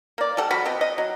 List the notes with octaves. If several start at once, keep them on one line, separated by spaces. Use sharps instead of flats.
A#3 D5
G3 G4 A4 F#5
F3 F#4 B5
B3 C4 D#5
D#5
F#3